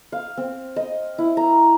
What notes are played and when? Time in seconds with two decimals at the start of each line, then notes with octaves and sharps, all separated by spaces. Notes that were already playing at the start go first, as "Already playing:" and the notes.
0.12 F5
0.37 C4
0.76 D#5
1.18 E4
1.37 A#5